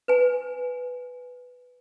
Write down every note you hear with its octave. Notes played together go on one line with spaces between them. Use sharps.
B4 G#5